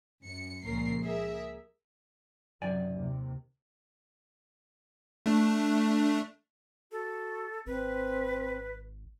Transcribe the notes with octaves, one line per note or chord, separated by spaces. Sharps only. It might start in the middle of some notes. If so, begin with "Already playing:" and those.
F#2 C#7
C#2 A#2 F3 C#4 A#4 C7
G#4 A#4 E5
F#2 C3 D#3 F#3 D5 G#5
D#2 C3
A3 D4
F#4 A4
G#1 C4 B4